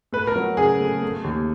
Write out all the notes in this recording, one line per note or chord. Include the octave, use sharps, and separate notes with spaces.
A3 B4
A#4
F#3
C#3 G#4
A3
A3
D#2